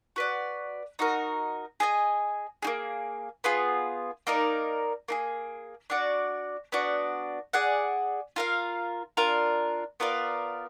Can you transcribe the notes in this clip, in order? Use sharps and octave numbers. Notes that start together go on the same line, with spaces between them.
F#4 B4 D5
D#4 F#4 A#4
G#4 D#5 G#5
A#3 D#4 G#4
B3 F4 G#4
A#3 D#4 A#4 D5
A#3 D#4 G#4
D4 F#4 D5
B3 D4 F#4 D5
G#4 D5 F#5
F4 A#4 F5
D4 F4 A#4
B3 F4 A#4 D5